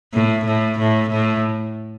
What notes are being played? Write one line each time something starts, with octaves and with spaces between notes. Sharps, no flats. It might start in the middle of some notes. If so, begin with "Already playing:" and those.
A2
A2
A2
A2